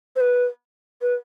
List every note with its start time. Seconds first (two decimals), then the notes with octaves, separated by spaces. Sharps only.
0.16 C5
0.20 B4
1.02 B4